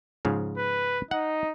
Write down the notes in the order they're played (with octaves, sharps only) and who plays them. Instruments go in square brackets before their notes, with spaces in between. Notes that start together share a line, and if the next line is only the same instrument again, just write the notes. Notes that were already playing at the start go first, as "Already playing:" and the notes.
[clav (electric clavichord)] G#2 C#3 F3
[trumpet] B4
[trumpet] D#4 [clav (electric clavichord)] F#5